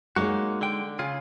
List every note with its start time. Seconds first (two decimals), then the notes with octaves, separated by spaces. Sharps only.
0.16 G#3 A#3 D#4 F#4 C#5
0.61 D3 G5
0.99 C#3 F4 G#4